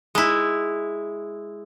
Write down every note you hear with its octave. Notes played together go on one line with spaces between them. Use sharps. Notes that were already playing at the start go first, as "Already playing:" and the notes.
G#3 E4